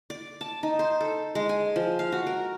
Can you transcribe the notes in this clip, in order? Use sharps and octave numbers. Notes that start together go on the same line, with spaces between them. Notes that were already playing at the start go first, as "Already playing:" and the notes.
D5
A5
D#4
C5
A4
G#3
G#5
F3
F5
F#4
A#4